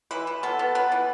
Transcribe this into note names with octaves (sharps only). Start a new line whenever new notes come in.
E3 B4
E3
B3 A4
B3
B3 B4
E3